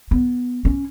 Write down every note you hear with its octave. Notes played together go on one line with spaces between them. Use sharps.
B3
C#4